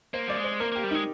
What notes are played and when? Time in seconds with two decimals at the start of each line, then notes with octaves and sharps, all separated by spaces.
0.14 A#3 C5
0.28 G3 D5
0.37 G#3
0.44 C5
0.60 A#3 A#4
0.72 A#3 G4
0.84 G3
0.91 G#3 D#4